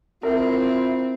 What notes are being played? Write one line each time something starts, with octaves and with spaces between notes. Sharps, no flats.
C4 E4 F4 A#4 E5